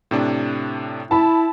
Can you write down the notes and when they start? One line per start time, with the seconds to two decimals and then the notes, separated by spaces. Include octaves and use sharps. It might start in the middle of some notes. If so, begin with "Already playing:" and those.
0.11 A2 C3 D4
1.11 E4 A5 B5